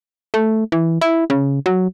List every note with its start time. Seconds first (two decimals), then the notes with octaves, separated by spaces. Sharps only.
0.34 A3
0.72 E3
1.01 E4
1.30 C#3
1.66 F#3